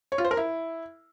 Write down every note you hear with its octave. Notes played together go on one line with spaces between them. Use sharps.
C#5
F4
C5
A#4
E4